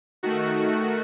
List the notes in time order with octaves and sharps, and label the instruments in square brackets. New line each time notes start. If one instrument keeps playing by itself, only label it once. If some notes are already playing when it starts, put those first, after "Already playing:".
[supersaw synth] D#3 A3 F#4